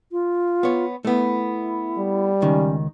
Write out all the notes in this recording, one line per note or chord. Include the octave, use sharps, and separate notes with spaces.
F4
B3 C#5
A3 B3 E4
G3
C#2 D#3 C#4